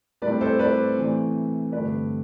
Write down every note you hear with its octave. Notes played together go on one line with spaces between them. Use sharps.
A2 G3 C4 B4 D5
A4 C5
B4 D5
C3 E3 A3
G2 D3 A3 C4 B4 D5